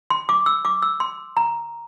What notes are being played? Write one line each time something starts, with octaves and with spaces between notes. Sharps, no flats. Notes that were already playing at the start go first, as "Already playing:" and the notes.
C6
D6
E6
D6
E6
C6
A#5